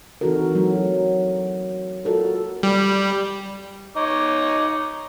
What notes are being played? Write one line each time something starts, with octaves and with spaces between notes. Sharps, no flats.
E3 C4 D#4 F#4 A4 A#4
F#3 A3
F4 F#4 A4 A#4
G3
D#4 C#5 D6